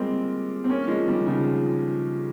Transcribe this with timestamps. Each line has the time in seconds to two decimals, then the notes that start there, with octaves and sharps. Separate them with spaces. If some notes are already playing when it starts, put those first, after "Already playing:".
Already playing: G3 G#3 A#3 C4 F4
0.64 C4
0.70 A#3 C#4
0.88 F3 G#3
1.07 D#3 G3
1.26 C#3 F3